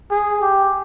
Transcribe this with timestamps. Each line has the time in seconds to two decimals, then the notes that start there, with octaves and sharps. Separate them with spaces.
0.11 G#4
0.41 G4